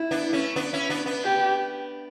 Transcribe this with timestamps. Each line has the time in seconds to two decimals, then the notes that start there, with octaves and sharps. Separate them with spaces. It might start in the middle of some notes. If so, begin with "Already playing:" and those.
Already playing: E4
0.11 B3 D4
0.33 A3 C#4
0.56 B3 D4
0.73 C#4 E4
0.89 B3 D4
1.06 B3 D4
1.24 G4